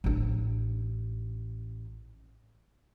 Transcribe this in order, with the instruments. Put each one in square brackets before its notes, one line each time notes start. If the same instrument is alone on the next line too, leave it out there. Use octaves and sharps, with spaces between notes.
[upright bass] A1 D4